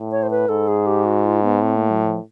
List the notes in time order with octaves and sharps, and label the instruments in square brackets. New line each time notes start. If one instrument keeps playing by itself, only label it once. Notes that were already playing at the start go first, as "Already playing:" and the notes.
Already playing: [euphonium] A2
[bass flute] C#5
C5
B4
[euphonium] G#2 [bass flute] A4
[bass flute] G#4
G4
F#4
F4
B3
[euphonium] A2 [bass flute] C4
[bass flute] A#3
F#3
F3